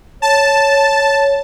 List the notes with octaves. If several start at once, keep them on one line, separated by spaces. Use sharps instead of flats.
C#5 A5